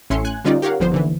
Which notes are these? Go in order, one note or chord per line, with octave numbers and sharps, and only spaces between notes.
A1 A2 C#4 E5 C6 C#7
G#5 F#6 G#6
D3 G3 C#4 D#4 F4 D5
G4 A#4 C#5 F5 F#5
G1 F2 F3 B3 C5
D#2 D3 E3